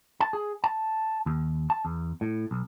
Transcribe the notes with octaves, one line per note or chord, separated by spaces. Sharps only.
A5
G#4
A5
D#2
A5
E2
A2
B1